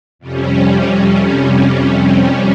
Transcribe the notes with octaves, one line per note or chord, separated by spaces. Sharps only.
F2 C3 G3 C#4